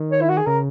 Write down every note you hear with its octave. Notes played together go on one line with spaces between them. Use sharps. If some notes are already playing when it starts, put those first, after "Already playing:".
Already playing: D#3
C#5
E4
F#4
G#4
C#3 A#4